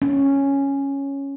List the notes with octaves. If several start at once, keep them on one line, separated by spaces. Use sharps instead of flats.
C#4